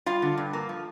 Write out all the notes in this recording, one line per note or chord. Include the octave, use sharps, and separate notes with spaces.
G3 F4 F5
D3
G2
A#3
F3